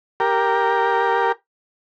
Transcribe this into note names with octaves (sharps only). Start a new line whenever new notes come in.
G4 A#4